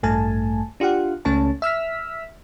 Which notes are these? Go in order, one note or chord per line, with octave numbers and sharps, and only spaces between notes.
A1 G2 A3 G#5 A5
D4 F4 G4 F5 F#5
C#2 A3 C#4 C#5 A5
E5 E6 F6 B6